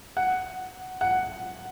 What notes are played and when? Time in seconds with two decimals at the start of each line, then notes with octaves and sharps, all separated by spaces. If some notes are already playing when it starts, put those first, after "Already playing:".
0.17 F#5
1.01 F#5